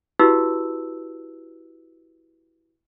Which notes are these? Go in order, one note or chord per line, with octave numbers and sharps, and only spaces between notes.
E4 F#4 G4 B4 E6